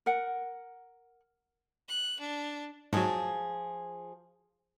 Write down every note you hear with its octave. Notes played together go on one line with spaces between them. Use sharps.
A#4 F#5
F#6
D4
G#2 F3 F#3 G#4